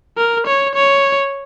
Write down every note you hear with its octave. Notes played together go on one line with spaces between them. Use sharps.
A#4
C#5
C#5